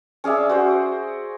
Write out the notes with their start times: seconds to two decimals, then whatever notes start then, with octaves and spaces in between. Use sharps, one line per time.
0.24 C#4 G#4 D5 E5
0.49 F#4 C5